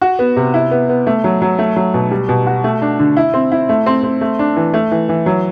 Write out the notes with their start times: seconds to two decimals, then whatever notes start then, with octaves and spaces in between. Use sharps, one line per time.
0.01 F#4
0.19 B3
0.36 C3
0.54 E4
0.71 B3
0.89 B3
1.07 A3
1.24 F#3
1.42 F#3
1.59 A3
1.76 F#3
1.94 B2
2.11 G3
2.29 B2
2.47 F#4
2.64 A3
2.82 D4
2.99 D3
3.17 E4
3.34 C4
3.52 E4
3.69 A3
3.86 C4
4.03 C4
4.21 A3
4.39 D4
4.56 E3
4.74 A3
4.91 E3
5.09 E3
5.26 F#3